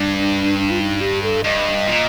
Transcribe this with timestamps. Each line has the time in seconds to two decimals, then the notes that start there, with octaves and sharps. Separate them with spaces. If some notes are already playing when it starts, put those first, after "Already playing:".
Already playing: G2 D4
0.59 D4
0.70 F4
0.80 D#4
1.01 G4
1.23 A4
1.44 G2 D#5
1.87 A#2